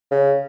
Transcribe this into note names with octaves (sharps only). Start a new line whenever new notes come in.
C#3